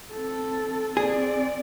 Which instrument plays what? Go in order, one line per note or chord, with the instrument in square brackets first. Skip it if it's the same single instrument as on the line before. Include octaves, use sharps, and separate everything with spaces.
[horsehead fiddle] C4 A4
[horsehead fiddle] C4 D5 [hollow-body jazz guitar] G#4